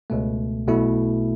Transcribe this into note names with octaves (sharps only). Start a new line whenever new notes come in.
C#2 B2 A3
B1 B2 A3 E4